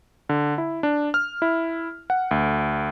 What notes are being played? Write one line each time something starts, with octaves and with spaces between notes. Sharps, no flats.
D3
E4
D4
F6
E4
F#5
D2